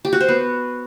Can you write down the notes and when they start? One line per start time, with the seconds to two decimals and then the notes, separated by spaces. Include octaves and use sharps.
0.05 G4
0.13 F#4
0.21 C5
0.28 B3